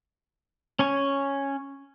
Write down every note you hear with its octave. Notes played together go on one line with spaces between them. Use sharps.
C#4 C#5 G#5